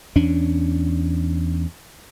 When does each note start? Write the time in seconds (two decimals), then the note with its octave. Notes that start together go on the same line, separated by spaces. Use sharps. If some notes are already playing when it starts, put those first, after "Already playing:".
0.16 E2 C#4 D4